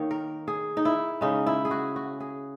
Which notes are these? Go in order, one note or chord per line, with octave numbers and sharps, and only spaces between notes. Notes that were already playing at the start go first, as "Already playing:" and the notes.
Already playing: D#3 A#3 D#4 C#5
A#4
G#4
D#4
E4
C#3 G#3 C#4 D#4
E4
G#4
F#4
F#4
G#4